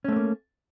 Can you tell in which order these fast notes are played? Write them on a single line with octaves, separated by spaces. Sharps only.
C#4 A3 C4 A#3